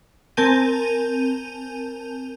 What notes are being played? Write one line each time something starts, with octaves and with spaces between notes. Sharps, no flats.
C4 A#4 G#5 A5 G6 D#7